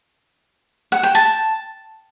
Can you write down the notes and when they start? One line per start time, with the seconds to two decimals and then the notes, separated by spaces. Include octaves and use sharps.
0.92 F#5
1.03 G5
1.15 A5